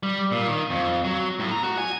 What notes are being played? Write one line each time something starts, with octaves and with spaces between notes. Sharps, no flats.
G3
A#2
D#3
F2
F#3
A2
A#5
F#4
G#5